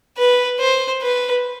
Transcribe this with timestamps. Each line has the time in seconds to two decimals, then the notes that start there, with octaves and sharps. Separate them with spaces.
0.18 B4
0.60 C5
1.02 B4